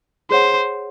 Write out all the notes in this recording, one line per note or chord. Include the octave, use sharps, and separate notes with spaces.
G#4 C5 C#5 F#5